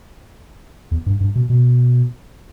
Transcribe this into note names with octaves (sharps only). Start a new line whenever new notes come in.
E2
G2
G2
B2
B2